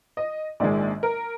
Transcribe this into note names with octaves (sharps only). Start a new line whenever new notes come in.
D#5
A#1 G#2 D#3 G#3 D5
A#4